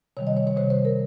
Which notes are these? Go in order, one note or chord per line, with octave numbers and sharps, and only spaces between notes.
C3 D#3 G3 C#5
D#5
C#5
C#5
C3 D#3 G3 C5
C5
A#4